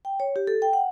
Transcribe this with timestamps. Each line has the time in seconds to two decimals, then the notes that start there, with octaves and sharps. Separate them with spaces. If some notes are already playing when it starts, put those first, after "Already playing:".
0.05 G5
0.20 C#5
0.36 G4
0.47 A4
0.62 G5
0.73 F#5